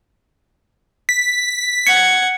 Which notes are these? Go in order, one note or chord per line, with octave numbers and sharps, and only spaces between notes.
B6
F#5 G#6 C#7